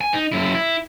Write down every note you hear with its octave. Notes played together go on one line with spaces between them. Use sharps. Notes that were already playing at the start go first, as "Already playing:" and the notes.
G#5
D#4
F#2 E4
E4